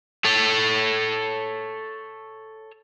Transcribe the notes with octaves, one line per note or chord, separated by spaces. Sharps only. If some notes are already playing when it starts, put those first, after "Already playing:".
A4 C#5